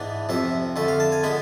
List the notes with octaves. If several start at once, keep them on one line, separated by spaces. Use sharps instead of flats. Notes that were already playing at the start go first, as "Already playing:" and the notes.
Already playing: G#2 E3 B3 D4
F2 C3 F3 E5
F2 D3 A3 E5
F5
A5
G#5
D3 G#3 B3 B5